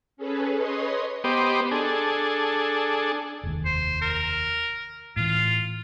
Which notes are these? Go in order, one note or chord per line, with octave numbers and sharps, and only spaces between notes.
C#4 G#4 A4 B4
B4 C#5 D#5 C6 D#6
B3 G4 C5 D#5 D6
D4 G#4 A4
F1 D#2
C5
A#4
A2 E3 F4